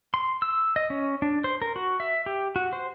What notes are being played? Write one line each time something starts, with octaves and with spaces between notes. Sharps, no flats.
C6
E6
D#5
C#4
D4
C5
A#4
F#4
E5
G4
F#4
C5